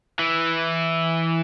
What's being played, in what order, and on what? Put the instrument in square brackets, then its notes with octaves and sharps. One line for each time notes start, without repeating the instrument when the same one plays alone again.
[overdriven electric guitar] E3